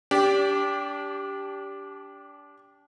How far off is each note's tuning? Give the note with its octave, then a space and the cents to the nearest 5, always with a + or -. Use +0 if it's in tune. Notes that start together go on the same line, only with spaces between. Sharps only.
D4 -30 G4 +0